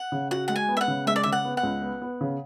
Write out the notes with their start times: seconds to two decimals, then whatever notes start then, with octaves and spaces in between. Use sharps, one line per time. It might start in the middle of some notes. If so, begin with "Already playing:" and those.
Already playing: F#5
0.12 C#3
0.31 F#4 F#5
0.48 G#3 F#5
0.56 G#5
0.69 B3
0.77 E5
0.81 F#5
0.88 C#3
1.07 G#3 E5
1.16 D5
1.23 C#3 E5
1.32 F#5
1.45 B3
1.57 F#5
1.63 C#2
1.82 B3
2.02 B3
2.21 C#3